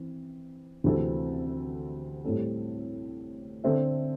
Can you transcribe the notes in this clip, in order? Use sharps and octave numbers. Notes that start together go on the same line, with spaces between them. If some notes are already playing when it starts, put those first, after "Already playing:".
Already playing: E3 C4
D2 C3 E3 C4 A4
A2 G3 C4 A4
D3 C4 A4 C5 E5